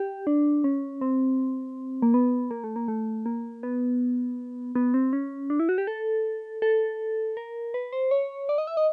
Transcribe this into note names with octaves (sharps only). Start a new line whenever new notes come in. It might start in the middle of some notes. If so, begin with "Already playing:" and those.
Already playing: G4
D4
C#4
C4
A#3
B3
A#3
A3
A#3
A3
A#3
B3
B3
C4
C#4
D4
E4
F#4
G4
A4
A4
A#4
B4
C5
C#5
D5
D#5
E5
D#5